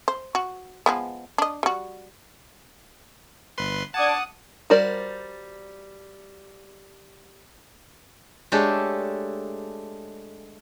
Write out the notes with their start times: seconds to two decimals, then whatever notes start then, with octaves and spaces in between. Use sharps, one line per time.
0.08 C5
0.35 F#4
0.86 F3 G#3 B3
1.38 D4 D#5
1.63 G3 F#4
3.58 G1 B4 C6
3.94 D4 F#5 A5 D6 D#6 G#6
4.70 G3 F#4 A#4 C5 D5
8.52 G#3 A3 D4 G4 A4 C#5